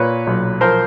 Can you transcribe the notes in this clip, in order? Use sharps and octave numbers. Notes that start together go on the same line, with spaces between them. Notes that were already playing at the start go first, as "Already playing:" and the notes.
Already playing: A#2 B4 C#5
B1
F3 A#4 C5